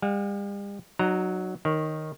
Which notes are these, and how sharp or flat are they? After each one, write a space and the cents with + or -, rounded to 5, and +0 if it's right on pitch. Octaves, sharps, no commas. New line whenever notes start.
G3 +45 F#5 -40
F#3 +0 D#4 -30 A#5 +0
D#3 +0 C#5 -15